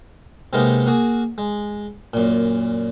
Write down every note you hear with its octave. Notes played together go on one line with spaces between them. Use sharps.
C3 G#3 A#3 B3 D#4 A#4
A#3 F#4 G#4
G#3
F#2 A#2